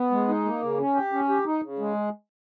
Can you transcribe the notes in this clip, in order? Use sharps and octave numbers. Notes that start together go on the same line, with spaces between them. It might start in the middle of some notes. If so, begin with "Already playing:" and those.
Already playing: B3
G#3
D#4
A#3
C#3
C#4
G4
C#4
G4
D#4
C#3
G#3